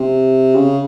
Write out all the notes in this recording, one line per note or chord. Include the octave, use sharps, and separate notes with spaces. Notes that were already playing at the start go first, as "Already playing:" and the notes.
Already playing: C3
C#3